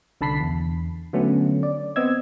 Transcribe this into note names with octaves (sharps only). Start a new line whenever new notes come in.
C2 D3 A5 B5 B6 C7
E2
D3 F#3 A3 B3 C#4
D5
B3 C4 D#5 E6 G#6